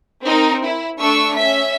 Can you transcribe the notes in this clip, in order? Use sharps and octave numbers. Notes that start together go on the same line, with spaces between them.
C4 D#4 A#4
E4
A3 D4 C#6 E6
C#4 E5 B6